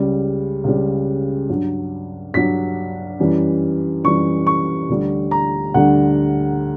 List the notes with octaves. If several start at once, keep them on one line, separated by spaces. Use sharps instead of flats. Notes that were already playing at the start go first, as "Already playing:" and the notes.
Already playing: C#2 C#3 G3
C#2 C#3 G3
G2 F#3
G2 F#3 B6
F#2 E3 G3
F#2 E3 G3 C#6
C#6
D2 D3 G3
A#5
D2 D3 G3 F#5